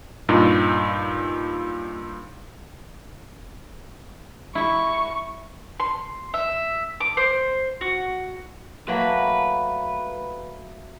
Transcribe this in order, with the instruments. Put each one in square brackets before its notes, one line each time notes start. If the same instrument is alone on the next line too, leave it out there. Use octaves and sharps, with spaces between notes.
[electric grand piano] G2 A#2 D#4
[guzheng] E4 E5 [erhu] C#6
[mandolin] C6
E5
D6
C5
F#4
[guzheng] F#3 A3 A#3 [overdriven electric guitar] B4